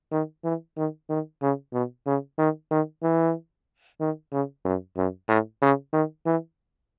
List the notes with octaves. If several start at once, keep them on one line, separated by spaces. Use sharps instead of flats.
D#3
E3
D#3
D#3
C#3
B2
C#3
D#3
D#3
E3
D#3
C#3
F#2
F#2
A2
C#3
D#3
E3